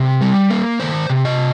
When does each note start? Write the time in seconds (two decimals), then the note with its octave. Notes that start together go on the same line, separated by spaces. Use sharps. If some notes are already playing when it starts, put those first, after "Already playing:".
Already playing: C3 A#4
0.21 G3
0.50 A#3
0.80 D#3 C5
1.10 C3
1.25 D#5